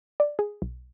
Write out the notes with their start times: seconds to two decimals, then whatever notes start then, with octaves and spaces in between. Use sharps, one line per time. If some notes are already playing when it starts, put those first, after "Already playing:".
0.20 D5
0.39 G#4
0.62 B1